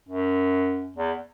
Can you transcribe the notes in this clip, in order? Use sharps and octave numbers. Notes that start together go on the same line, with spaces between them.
F#2
E2